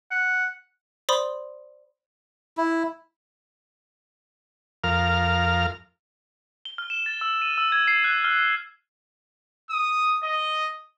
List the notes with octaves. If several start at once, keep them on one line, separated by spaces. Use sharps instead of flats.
F#5
C5 D5 B5 C6 D#6
E4
F2 A#4 F5 F6
G7
F6
E7
A6
E6
D#7
E6
G#6
C7
F#6
F6
D#6
D#5